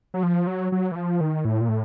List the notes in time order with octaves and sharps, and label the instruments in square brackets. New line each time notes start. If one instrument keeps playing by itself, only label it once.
[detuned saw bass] F#3
F3
F#3
F#3
E3
F3
D#3
A2
A#2
A2